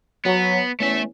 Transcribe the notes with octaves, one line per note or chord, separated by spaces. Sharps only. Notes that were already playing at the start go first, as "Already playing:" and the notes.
F#3 B3
E2 A3 C#4 E5